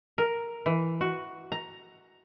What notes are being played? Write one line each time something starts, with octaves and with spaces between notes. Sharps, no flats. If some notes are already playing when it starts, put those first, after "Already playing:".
A#4
E3
F#4
A#5